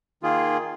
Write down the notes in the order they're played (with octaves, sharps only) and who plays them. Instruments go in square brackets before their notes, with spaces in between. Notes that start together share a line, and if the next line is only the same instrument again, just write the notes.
[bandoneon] D#3 A#3 F4 G#4